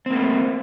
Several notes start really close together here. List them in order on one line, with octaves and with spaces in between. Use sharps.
C4 A#3 A3